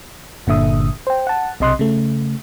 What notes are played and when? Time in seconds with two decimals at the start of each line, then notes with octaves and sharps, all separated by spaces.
0.47 G1 A#2 D3 E5 D#6
1.07 C5 G5
1.27 F#5 A5
1.60 B1 C3 D#5 C6 D#6 F#6
1.79 C#3 A3